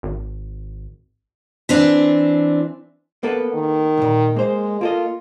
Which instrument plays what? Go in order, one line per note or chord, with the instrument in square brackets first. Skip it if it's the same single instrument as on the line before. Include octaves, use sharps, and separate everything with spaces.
[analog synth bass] G#1
[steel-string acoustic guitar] E3 C4 D4
[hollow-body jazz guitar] A#3 A4 B4 [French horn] B3
[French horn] D#3
[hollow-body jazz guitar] B1 A#2
[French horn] G#3 [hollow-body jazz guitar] A#3 C5
[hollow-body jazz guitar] A#3 A4 D#5 [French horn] F4